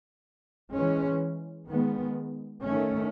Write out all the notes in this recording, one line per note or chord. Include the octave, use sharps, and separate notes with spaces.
E3 G#3 C#4
D#3 G#3 B3
D#3 A3 C#4